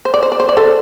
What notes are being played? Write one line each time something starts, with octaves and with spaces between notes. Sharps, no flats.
C5
D5
C5
D5
C5
D5
A4 C5